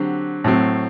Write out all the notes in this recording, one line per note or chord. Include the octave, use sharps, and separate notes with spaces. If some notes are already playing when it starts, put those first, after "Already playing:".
Already playing: D3 F#3 C4 G4
A2 F#3 C4